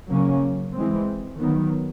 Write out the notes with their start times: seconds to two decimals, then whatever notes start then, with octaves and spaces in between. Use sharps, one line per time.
0.09 C#3 F#3 A#3 C#4
0.74 E3 G#3 C4
1.39 D#3 F#3 B3